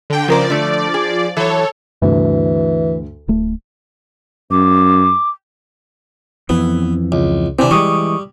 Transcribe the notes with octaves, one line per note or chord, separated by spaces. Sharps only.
D3 G5
C#3 F3 A#4 C5 D5
D3 A3
G#4
E3 F#3 A4 C#5
D2 G2 C3 E3
D1 A3
F#2 D6
F2 E3 B3 C4
C#2
C3 E3 C4 D4
E3 G3 G#3 C#6 D#6